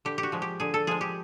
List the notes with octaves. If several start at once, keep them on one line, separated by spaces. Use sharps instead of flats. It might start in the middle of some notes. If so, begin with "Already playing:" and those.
D3 G4
G4
F#4
F3 G#3
G4
D3 G#4
A4
F3 G#3 G#4
G4